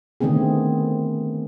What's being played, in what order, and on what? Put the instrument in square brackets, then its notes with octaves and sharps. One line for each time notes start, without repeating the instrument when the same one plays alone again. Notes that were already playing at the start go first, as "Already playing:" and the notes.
[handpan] D3 D#3 A3 B3 C4 G#4